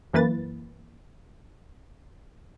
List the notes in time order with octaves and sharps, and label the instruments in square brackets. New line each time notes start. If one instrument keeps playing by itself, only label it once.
[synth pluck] F#2 E3 A#3 B4 A6